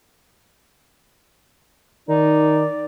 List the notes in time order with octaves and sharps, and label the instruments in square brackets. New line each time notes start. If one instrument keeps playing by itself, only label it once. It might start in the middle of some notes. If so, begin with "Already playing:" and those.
[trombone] D#3 [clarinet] D#4 [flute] D5